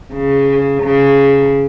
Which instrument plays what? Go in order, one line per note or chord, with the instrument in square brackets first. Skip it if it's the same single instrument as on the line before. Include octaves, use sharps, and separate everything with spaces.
[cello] C#3
C#3